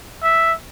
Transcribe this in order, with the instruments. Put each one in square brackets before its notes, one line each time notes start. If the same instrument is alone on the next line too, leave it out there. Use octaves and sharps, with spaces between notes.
[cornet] E5